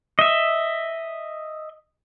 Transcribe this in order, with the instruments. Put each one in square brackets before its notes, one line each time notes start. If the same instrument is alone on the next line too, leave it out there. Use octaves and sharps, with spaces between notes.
[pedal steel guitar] D#5 E5